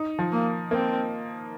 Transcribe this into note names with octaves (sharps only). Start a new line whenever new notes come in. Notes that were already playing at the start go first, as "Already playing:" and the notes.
Already playing: D#4
F3
A#3
A#3 C4